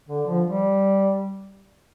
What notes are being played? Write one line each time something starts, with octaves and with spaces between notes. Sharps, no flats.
D3
F3
G3